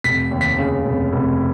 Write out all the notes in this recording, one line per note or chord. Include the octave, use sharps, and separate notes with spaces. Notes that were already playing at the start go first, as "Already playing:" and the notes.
F1 B6
D#2
B6
C#3
F1
F1